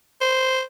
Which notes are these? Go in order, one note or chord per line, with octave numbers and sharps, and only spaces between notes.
C5